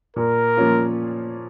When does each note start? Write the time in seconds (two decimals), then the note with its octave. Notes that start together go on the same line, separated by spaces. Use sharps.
0.16 A#2 A#4
0.57 F3 A#3 C#4 F4